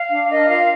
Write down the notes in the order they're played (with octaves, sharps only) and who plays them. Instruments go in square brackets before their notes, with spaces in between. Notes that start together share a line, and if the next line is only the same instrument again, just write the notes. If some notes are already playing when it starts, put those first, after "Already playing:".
Already playing: [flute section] F5
D4
A#4 D#5
F4 F5